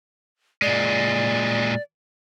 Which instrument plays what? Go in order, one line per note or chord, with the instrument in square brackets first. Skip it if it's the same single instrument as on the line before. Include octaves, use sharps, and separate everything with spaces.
[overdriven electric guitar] A#2 G#3 [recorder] D5